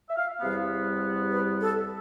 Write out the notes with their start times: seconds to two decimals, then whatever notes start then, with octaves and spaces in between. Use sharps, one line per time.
0.09 E5
0.17 F5
0.39 E2 C3 G3 B3 F5
1.30 B4
1.60 A4